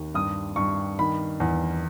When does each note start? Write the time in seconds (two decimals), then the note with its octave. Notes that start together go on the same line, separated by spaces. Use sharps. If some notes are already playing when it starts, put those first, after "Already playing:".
Already playing: D#2
0.14 G2 D#6
0.56 G2 C#6
0.99 D#3 B5
1.40 E2